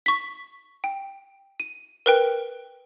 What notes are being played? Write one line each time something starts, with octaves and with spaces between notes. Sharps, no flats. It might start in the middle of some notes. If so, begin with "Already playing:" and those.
C#6 B6
G5
D#7
A#4 B4 G5